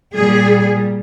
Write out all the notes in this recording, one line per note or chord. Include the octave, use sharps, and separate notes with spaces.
A#2 G3 G#4